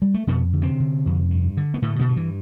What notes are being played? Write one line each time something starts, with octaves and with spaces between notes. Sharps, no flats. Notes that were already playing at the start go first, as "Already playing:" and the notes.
G3
A3
F2 B2 B3
D3
C3 C4
D3
F2
G2
D3
B3
A2 D3 A3
B2 B3
G2
E3